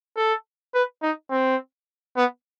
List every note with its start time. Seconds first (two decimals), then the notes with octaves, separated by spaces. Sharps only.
0.17 A4
0.75 B4
1.03 D#4
1.31 C4
2.17 B3